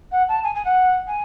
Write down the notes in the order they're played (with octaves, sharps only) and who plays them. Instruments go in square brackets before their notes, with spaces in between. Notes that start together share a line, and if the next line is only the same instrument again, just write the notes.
[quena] F#5
A5
G#5
G#5
F#5
G#5